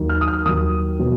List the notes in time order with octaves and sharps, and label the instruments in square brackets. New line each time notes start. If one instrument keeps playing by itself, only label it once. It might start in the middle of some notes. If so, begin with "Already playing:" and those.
Already playing: [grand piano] D#2 D#3 F#3
F6
D#6
F6
D#2 D#3 F#3 D#6
B2 F#3